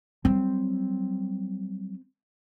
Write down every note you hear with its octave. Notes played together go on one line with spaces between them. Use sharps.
F#3 G3 C4